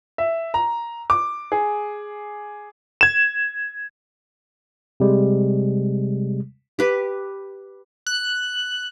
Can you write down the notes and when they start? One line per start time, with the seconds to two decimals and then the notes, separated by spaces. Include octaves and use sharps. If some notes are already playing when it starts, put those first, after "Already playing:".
0.18 E5
0.54 A#5
1.10 D6
1.52 G#4
3.01 G#6 E7
5.00 C3 G3 G#3
6.79 G4 B4
8.07 F#6